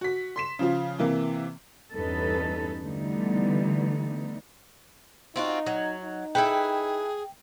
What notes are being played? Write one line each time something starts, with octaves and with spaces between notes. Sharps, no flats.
F#4 B6
C6 B6 E7
C#3 F3 F4
C3 E3 A#3
E2 G2 C#4 D#4 A4 B4
D3 E3 G3 A3 B3 D#4
C4 D#4 F4 F#4
F#3
D#4
E4 G#4 A4 B4 G5